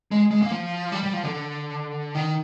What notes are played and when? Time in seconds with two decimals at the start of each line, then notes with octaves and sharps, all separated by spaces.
0.11 G#3
0.31 G#3
0.42 A#3
0.51 F3
0.92 G3
1.03 G3
1.13 F3
1.23 D3
2.15 D#3